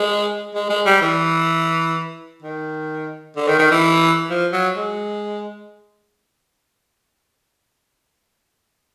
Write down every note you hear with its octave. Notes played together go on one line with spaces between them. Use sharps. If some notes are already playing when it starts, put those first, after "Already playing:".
Already playing: G#3
G#3
G#3
G3
E3
D#3
D3
D#3
D#3
E3
F3
F#3
G#3